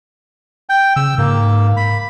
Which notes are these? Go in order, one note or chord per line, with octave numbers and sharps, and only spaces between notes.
G5
C#3 E6
G#2 A#3
B5